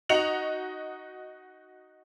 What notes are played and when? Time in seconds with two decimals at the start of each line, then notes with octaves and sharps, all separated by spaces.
0.09 D#4 F#4 D#5 C#7 F7 F#7